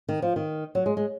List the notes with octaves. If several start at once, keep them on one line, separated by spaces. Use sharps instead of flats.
D#3
F3
D#3
F#3
G#3
G#3